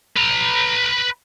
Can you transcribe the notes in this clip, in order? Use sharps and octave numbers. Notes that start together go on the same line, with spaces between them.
B4 A#5